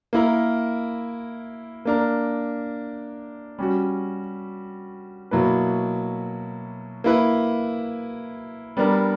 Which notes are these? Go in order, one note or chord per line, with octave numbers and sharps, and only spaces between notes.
A#3 E4 A#4
A#3 D4 A#4
G3 C#4 F#4
B2 F#3 A#3 E4 B4
A#3 E4 B4
G3 B3 D4 A#4